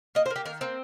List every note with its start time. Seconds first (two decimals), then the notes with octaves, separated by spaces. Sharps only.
0.15 A#3 D#5
0.26 C5
0.30 A#3
0.36 G4
0.46 D#3 A#4
0.61 A#3 C4